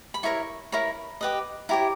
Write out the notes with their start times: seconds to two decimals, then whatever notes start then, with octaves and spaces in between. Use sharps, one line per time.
0.14 B5
0.23 E4 A#4 C#5 C#6
0.72 E4 A#4 C#5 B5
1.21 G4 B4 D#5
1.69 E4 G4 C#5 A#5